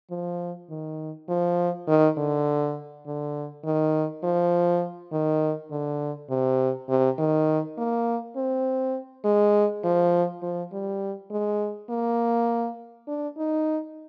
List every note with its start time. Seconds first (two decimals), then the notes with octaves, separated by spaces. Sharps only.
0.11 F3
0.70 D#3
1.29 F3
1.88 D#3
2.17 D3
3.06 D3
3.64 D#3
4.23 F3
5.12 D#3
5.71 D3
6.30 C3
6.89 C3
7.19 D#3
7.78 A#3
8.36 C4
9.25 G#3
9.84 F3
10.42 F3
10.72 G3
11.31 G#3
11.90 A#3
13.08 D4
13.37 D#4